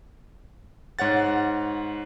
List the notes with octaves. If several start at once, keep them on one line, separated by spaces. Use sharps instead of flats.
G#2 C#5 F#5 A6